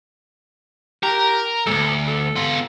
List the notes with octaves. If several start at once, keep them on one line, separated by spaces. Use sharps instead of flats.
G4 A#4
D2 G#2 A4
A4
B3 F4